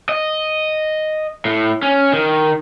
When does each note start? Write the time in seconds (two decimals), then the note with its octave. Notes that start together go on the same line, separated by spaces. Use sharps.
0.09 D#5
1.45 A2
1.83 C#4
2.13 D#3